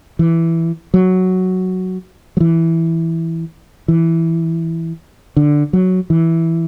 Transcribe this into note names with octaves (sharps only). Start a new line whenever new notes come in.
E3
F#3
F#3
E3
E3
D3
F#3
E3